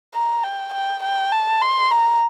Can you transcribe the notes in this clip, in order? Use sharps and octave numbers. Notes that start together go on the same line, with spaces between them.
A#5
G5
G5
G5
A5
C6
A#5